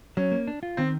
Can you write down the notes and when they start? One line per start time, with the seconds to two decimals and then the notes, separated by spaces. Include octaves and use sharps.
0.17 F#3 C#4
0.32 A#3
0.47 D4
0.63 F4
0.77 D#3 C4